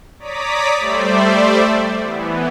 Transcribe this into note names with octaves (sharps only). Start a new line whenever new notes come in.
C#5 D5 A#5 D6 D#6 B6
G3 A3 C5 D5 E5
E3 B3